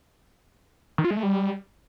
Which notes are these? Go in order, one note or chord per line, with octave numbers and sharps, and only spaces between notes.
D#3
F4
G#3
A3
G3